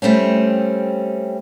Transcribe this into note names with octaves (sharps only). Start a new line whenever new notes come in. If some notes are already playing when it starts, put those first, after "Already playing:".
G3 A3 C4 C#4